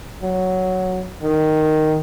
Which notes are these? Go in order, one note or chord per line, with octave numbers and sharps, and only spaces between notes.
F#3
D#3